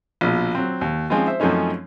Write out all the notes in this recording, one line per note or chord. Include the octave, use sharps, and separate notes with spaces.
A#1 B2
F#3 C4
D#2
F3 G#3 C4 C#4 D#4 F4
C5 E5
F#2 F3 A3 C4 C#4 D#4